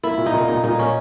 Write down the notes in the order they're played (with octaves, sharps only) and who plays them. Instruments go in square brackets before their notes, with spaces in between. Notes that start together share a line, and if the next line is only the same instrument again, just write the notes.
[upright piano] A#3 [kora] E4
[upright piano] A#2
[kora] D#4
[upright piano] A#2
[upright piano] A#2 [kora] D#4
[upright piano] A#2 [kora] D#4
[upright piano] A#3 [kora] C#4